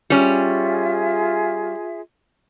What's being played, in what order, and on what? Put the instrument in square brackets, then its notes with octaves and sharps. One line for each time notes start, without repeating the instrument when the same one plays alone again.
[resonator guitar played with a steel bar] G3 C#4 [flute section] F4 G#4 E5